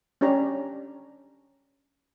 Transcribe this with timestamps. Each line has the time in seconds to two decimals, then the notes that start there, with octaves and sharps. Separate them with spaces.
0.21 C#4 D4 G4 C#5 A#5